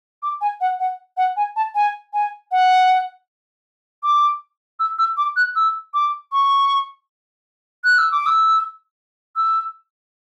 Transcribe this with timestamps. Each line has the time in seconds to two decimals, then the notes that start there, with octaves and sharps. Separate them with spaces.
0.23 D6
0.41 G#5
0.61 F#5
0.80 F#5
1.17 F#5
1.37 G#5
1.56 A5
1.75 G#5
2.13 G#5
2.52 F#5
4.03 D6
4.80 E6
4.99 E6
5.17 D6
5.36 F#6
5.56 E6
5.94 D6
6.32 C#6
7.84 F#6
7.98 E6
8.12 D6
8.26 E6
9.36 E6